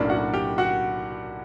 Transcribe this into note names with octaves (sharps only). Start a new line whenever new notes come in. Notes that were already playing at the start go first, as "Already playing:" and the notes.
Already playing: B1 A2 F#3 A#3 C#4 D4 D5
F#4 F#5
G4 G5
F#4 F#5